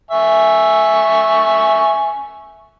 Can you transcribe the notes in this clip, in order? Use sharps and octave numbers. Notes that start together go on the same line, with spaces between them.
E5 G#5 C#6